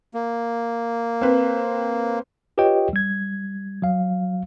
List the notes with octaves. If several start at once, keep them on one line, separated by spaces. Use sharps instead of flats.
A#3
C4 B4
F4 G4 B4 C#5 D#5 G5
G3 G#6
F#3 F5